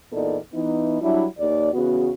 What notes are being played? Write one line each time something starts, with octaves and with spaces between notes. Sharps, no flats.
E2 A#2 B3 D#4 A4 D5
E3 B3 D#4
F#3 G3 D4 E4
D#2 D5
E2 C#3 B3 F#4